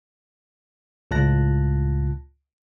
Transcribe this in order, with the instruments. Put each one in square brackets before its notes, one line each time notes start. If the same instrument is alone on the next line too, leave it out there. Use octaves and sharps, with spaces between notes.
[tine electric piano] C#2 A2 F4 A5 F#6 A#6